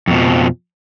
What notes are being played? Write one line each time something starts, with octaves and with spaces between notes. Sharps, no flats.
F2 B2 F3